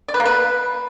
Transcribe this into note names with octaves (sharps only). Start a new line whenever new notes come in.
D5
B4
A#3
B4